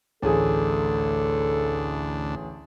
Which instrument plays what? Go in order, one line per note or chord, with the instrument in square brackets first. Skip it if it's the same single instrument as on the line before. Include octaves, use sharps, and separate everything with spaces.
[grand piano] A1 G#4 [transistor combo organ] D2 D4 [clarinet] A4